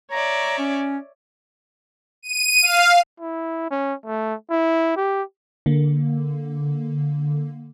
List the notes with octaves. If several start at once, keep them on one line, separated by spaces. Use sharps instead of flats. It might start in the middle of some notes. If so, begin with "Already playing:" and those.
C#5 D5 E5 A#5
C#4
D#7
F5
E4
C#4
A3
E4
G4
D3 A#3